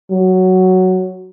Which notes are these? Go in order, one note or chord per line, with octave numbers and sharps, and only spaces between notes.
F#3